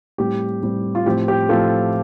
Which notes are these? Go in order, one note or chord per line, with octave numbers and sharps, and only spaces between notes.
A2 G3 C4 G4
A2 G3 C4
F4
A2 F3 C4 G4
G4
A2 F3 C4 F4 A4